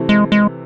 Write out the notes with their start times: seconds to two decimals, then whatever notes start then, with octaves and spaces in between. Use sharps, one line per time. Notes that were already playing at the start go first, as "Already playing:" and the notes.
Already playing: C3 E3 A3
0.09 G#3
0.32 G#3